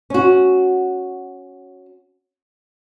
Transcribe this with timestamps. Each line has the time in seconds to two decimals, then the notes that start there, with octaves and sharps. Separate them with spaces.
0.10 C#4 F#4